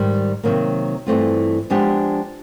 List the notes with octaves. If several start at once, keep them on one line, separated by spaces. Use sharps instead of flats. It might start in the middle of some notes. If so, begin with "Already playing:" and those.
Already playing: G#2 D#3 G3
C3 D#3 F#3 A#3
G2 E3 A3 C4 F4
F3 G#3 B3 D4 G4